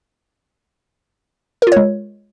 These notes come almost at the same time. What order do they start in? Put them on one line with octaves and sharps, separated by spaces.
A#4 F4 C#5 G#3